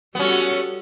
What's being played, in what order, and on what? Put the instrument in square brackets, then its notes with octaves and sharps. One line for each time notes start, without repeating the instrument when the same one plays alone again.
[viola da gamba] G3 F#4 A4 [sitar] B3 C#4